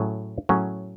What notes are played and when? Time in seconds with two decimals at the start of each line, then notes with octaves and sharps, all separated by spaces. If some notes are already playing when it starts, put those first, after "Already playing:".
Already playing: A2 F#3 C#4 G#4
0.49 A2 F#3 C#4 G#4